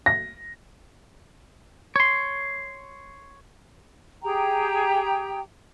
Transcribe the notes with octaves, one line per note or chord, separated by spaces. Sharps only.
A#6
C#5 C6
G4 G#4 G5 A#5